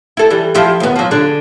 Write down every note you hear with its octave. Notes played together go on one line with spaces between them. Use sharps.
E4 A4
E3 G3
F3 E4 G4
D#2 B3
F3 F#3
D3 D4 G#4